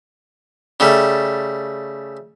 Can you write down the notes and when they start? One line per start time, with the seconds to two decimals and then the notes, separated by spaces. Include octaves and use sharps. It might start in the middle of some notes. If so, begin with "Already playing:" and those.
0.80 C#3 G3 A3